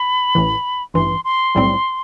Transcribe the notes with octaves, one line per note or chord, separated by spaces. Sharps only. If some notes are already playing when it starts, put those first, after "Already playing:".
Already playing: B5
A1 A2 E3
A1 G2 E3 C6
C6
B1 A2 G3 C4